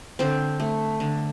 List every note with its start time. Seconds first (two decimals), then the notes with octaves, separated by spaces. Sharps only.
0.19 D3 C4 C5
0.60 A3
1.00 D3